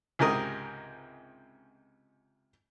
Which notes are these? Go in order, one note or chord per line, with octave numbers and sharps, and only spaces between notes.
C#2 G#2 C3 A#4 D#6